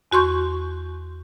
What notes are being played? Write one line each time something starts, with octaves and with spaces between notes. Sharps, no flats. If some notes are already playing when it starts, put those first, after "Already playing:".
E2 F#4 C6 C#6 G6